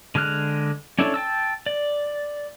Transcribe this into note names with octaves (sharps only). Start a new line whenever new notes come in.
D3 G#3 G#4 F6 F#6
C#4 D4 E4 A4 C#5
G5 A5 E6
D5